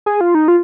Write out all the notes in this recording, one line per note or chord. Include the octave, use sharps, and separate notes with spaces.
G#4
F4
D#4
F4